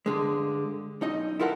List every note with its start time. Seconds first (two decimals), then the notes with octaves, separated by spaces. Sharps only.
0.06 G2 D3 G#3
1.01 B1 D#4 D#5
1.40 E4 F4 A4 A#4 F#5